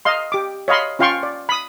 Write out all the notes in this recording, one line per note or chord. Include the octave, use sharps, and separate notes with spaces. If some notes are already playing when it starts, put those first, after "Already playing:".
D#5 F5 C6
G4 D6
C#5 D#5 F5 B5 C6
C#4 F4 F5 G5 C6 C#6
D5
B5 D#6